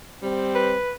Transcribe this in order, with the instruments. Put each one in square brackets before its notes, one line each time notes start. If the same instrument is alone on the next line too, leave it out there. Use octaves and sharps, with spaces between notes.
[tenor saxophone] G3 [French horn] C4
[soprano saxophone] B4